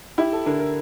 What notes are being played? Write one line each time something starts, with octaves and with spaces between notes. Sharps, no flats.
E4 G4
A4
D3 A#4
A#4